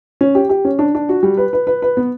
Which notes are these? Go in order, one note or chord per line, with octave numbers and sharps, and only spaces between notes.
C#4
G4
G4
C#4
D4
D4
F#4
G3
B4
B4
B4
B4
B3